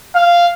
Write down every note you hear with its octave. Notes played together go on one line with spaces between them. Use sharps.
F5